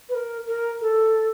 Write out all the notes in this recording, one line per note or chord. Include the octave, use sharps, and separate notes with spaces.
B4
A#4
A#4
A4